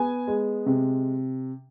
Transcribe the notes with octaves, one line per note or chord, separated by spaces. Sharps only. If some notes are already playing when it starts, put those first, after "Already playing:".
Already playing: B3 G#5
G#3
C3